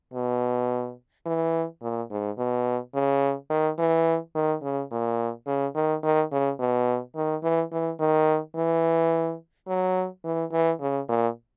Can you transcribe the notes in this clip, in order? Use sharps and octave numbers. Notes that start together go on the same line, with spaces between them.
B2
E3
A#2
G#2
B2
C#3
D#3
E3
D#3
C#3
A#2
C#3
D#3
D#3
C#3
B2
D#3
E3
E3
D#3
E3
F#3
E3
E3
C#3
A#2